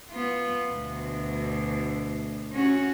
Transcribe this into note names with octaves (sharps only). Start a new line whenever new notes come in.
B3 F4
D2 B2
C#4 F#4